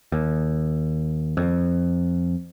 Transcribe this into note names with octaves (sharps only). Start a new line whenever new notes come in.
D#2
F2